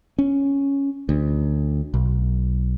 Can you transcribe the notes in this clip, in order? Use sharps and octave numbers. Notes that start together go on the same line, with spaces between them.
C#4
D2
B1